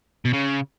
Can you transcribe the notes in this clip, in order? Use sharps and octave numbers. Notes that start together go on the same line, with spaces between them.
B2
C#3